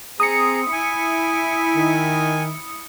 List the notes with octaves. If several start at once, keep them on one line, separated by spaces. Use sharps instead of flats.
C4 G#4 A#5 D#6 C#7
E4 G#5
D#3